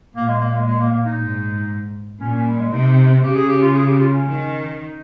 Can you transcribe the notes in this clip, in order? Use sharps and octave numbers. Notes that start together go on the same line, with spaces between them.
A#2 A#3
G#3
A#3
G#3
G#3
A#3
A#3
D#4
G#2
A#2 C#4
C#4
G3
G#3
C3 D#4
C#3 G4
G#4
G4
F4
G#4
G4
F4
C#4
D#3
D#4